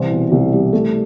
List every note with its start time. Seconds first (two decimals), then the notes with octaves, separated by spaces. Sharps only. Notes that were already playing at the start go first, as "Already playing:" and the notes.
Already playing: C2 E3 C5
0.11 B2
0.32 C2
0.52 G3
0.73 A3